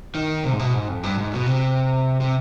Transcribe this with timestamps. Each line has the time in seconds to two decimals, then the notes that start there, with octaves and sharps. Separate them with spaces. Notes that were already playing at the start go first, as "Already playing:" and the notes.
0.15 D#3
0.44 C3
0.53 G#2
0.59 B2
0.74 G#2
0.88 F2
1.03 G2
1.18 G#2
1.33 B2
1.46 C3
2.21 C3